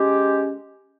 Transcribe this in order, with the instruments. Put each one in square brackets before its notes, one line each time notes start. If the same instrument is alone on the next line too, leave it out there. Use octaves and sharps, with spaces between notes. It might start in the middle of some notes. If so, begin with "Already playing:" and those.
Already playing: [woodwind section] G#3 C#4 G4